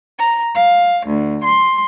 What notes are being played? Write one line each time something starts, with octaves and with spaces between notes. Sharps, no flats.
A#5
F5
D2
C6